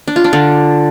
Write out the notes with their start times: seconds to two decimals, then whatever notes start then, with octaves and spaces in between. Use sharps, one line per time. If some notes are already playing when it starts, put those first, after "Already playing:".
0.08 D4
0.16 F4
0.24 D4
0.33 D3